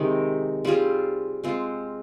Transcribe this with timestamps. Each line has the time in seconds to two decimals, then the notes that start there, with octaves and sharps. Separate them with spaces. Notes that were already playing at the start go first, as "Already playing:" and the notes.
Already playing: C3 D#3 G#3 D#4
0.65 G3 C4 F4 G#4
1.44 G#3 C4 F4